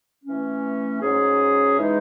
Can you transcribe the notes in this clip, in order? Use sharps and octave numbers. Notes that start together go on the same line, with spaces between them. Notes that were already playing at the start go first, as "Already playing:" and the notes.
E3 A3 C#4
G#2 F#3 C#4 G#4
E3 G#3 D#4